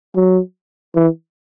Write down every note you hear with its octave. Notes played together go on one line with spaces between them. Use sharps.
F#3
E3